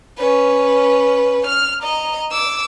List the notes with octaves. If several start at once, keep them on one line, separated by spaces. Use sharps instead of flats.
C#4 B4
F6
D#5 A#5
D6 E6